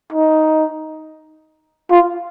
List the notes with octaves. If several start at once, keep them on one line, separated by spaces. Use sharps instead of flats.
D#4
F4